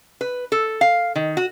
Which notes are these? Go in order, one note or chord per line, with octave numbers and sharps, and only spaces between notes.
B4
A4
F5
D#3
F#4